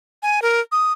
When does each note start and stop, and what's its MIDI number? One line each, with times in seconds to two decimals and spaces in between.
0.23 0.40 80
0.42 0.60 70
0.72 0.93 87